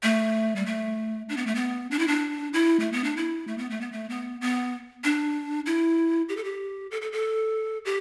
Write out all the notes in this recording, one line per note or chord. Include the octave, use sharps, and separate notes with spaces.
A3
G3
A3
D4
B3
A3
B3
D4
E4
D4
E4
A3
B3
D4
E4
A3
B3
A3
B3
A3
B3
B3
D4
E4
G4
A4
G4
A4
A4
A4
G4